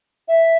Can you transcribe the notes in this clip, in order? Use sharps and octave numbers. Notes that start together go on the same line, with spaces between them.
E5